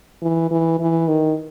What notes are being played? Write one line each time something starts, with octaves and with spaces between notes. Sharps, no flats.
E3
E3
E3
D#3